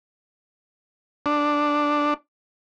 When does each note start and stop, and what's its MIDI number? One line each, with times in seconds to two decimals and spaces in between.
1.26 2.14 62